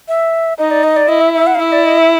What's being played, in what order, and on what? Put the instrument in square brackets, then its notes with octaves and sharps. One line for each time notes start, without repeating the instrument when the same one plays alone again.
[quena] E5
[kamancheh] D#4 [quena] D#5
[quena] D5
D#5
D5
[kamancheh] E4 [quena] D#5
[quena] E5
E5
F#5
F5
[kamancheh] E4 [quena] E5
[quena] D5
D#5
E5